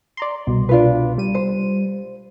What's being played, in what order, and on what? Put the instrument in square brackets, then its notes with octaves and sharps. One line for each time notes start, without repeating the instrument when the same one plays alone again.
[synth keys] D5 A#5 C6
C2 B2
[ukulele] D4 F4 B4
[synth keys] G3 D#7
[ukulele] C5